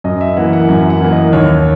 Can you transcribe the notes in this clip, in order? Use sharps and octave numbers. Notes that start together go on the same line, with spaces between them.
F#2 D#5
E5
E3 A#3 F#5
F#5
F#2 E5
F#5
E3 A#3
D#5
D#2 C#5